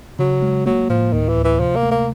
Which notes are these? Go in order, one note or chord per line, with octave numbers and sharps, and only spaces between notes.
C#3 F#3
G#3
F#3 A#3
A2 F3
D2 D#3
E3
D2
E3
C3 F3
A#3
A3
A#3